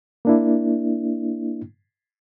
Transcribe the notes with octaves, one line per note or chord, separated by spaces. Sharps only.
A#3 D4 E4